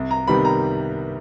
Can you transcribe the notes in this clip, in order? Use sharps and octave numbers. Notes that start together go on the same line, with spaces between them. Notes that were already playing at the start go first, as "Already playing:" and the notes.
Already playing: C2
A#5
C3 D#3 G3 B3 B5
A#5